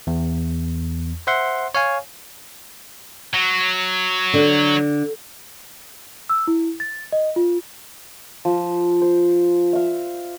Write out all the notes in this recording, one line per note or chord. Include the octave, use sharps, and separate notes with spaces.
E2
C5 E5 F#5 C6
C#5 F5 G#5
F#3
D3
E6
E4
A6
D#5
F4
F3
C5
E5 F5